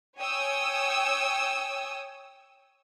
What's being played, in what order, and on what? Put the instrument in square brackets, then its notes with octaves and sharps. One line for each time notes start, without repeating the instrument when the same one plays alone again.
[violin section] C#5 G5 G#5 D#6 E6